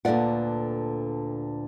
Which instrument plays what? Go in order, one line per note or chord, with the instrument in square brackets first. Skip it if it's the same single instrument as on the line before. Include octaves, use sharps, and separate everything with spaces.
[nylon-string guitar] D2 A#2 D3 B4 D5 F#5